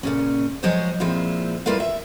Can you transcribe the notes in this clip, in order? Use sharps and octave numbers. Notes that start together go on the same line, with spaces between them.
A#2 C#3 C#4
F3 F#3 G#3 G#4 C5 C#5
A#2 F3 G#3 C4 E4 F4
G3 E4 F4 A#4 B4 F5
E5